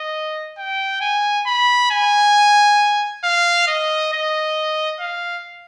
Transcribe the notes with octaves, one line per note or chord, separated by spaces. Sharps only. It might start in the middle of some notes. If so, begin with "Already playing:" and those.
Already playing: D#5
G5
G#5
B5
G#5
F5
D#5
D#5
F5